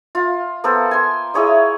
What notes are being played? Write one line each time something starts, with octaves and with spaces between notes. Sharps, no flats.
F4
A#3 B3 A4 C5
G#5 C6
E4 G#4 C#5 D#5